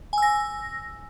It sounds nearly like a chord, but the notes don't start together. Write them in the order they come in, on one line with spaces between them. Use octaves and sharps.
G#5 E6 A#6